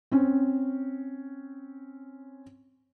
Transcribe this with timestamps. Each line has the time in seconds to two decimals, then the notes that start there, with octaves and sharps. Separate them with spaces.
0.12 C4 C#4